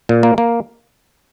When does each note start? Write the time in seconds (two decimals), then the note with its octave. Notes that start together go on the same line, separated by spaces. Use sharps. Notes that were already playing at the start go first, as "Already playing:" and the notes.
0.09 A#2
0.23 A#3
0.38 A#3